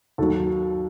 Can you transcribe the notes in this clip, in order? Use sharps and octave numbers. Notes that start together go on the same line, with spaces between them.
D#2 D#3 F#3 A4